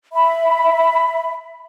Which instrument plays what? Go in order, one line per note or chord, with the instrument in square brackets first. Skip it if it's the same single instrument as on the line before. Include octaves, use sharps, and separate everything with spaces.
[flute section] E5 B5